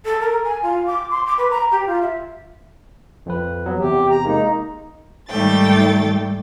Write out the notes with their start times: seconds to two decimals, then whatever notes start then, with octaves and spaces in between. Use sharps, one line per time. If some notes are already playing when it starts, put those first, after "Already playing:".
0.05 A4
0.21 A#4
0.44 G#5
0.63 F4
0.86 D6
1.11 C6
1.26 D6
1.38 B4
1.51 A#5
1.72 G4
1.87 F4
2.02 E5
3.26 F2 C4 B4
3.66 F#3 B3
3.79 E2 C3 G4
4.10 A#5
4.25 G#3 A#3 D#4
5.29 G#2 D#3 G3 A3 G5 A6